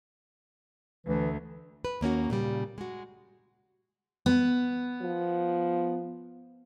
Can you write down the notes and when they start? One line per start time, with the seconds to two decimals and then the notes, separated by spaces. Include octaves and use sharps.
1.07 D2 E3
1.85 B4
2.01 D#2 A#3 C#4 F#4
2.30 A#2 C#3 G3
2.78 G#3 F#4
4.26 B3
5.02 F3